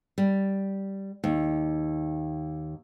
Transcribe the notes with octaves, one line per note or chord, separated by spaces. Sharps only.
G3
D#2